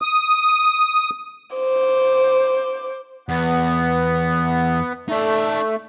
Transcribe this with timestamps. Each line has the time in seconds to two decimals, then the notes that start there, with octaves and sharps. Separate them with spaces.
0.02 D#6
1.56 C5 D6
3.29 E2 B3
5.09 A3 D#4 D5